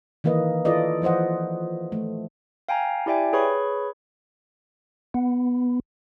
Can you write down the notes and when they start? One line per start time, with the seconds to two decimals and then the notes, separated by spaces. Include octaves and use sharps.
0.24 D#3 E3 A#3 B4 D#5
0.65 E4 F4 A4 B4 D5 D#5
1.02 E3 F3 C5 D#5 F#5
1.92 A3
2.69 F5 G5 G#5 A#5
3.06 E4 G4 D5 E5 G5 G#5
3.33 G#4 B4 C#5 B5 C#6
5.14 B3